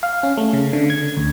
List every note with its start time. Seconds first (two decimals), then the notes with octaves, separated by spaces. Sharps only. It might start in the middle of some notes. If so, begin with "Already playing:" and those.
0.03 F5
0.23 C#4
0.38 A3
0.53 C#3
0.73 D3
0.90 G#6
1.17 D2